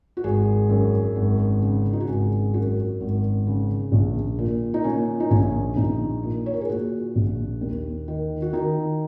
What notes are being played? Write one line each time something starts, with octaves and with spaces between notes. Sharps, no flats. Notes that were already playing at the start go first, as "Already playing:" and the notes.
F#4
G#1 G#4
F#2
G#1
C#3
D#4
F#4
G#1 G#4
F#2 F#4
G#1
C#3
A#1
A#2
D#4
A#2 C#4
D#4
A#1 C#4
A#1 D#4
A#2
C#5
A#4
G#4
A#2 F#4
A#1
D#2
D#3
F#4
D#3 D#4